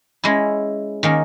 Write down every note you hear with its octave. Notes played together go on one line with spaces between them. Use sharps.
G#3 C#4 E4
D#3 A#3 C#4